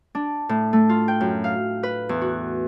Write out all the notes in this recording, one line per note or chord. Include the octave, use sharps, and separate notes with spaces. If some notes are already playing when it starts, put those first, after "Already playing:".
D4
A2
A3
F4
G5
F#2
F5
B4
E2
F#4